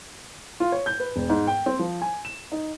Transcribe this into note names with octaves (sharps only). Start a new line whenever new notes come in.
F4
C#5
G6
B4
E1
G#2
G5
C4
F3
G#5
E7
D#4